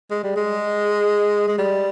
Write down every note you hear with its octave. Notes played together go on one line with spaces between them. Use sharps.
G#3
G3
G#3
G#3
G3